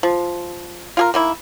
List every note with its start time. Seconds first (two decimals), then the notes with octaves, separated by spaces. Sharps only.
0.03 F3
0.97 F4 G#4 A#4
1.14 D#3 A#3 E4